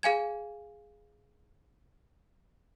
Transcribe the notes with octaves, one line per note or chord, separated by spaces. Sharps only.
G#4 F5 G#5 G#6